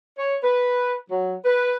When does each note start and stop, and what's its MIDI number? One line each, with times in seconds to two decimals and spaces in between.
0.18 0.36 73
0.43 0.96 71
1.10 1.36 54
1.45 1.77 71